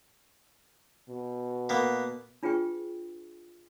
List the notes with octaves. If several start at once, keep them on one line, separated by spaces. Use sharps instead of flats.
B2
A#3 B3
D4 F4 G#4 B4 G5 C#6